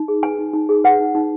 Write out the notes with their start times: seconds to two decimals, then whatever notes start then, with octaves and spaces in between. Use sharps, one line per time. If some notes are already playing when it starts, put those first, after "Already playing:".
Already playing: D#4
0.08 G#4
0.23 B4 G#5
0.39 D#4
0.53 D#4
0.69 G#4
0.84 B4 F#5
1.00 D#4
1.15 D#4